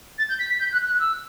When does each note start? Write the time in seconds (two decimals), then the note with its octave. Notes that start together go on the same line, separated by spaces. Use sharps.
0.18 A6
0.29 G6
0.39 B6
0.49 B6
0.59 G6
0.72 F#6
0.86 F#6
0.99 E6